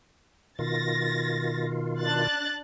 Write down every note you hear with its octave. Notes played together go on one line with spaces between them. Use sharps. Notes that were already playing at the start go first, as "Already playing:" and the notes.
B2 D#3 F4 A6 A#6
D4 F#6 A6